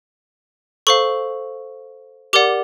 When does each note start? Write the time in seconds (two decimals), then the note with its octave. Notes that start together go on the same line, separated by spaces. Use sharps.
0.87 A4 C5 F5 C#6
2.33 G4 A#4 D5 F#5 D6